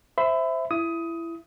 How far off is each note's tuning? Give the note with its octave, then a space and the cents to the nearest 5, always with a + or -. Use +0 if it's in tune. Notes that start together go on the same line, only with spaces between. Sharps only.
C5 +0 E5 +0 B5 +30
E4 +20 D#6 +15